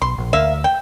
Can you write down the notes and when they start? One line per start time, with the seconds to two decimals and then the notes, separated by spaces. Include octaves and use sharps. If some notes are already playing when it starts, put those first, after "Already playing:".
0.01 B1 C6
0.18 A#1
0.33 D2 A#3 E5 F5
0.64 G5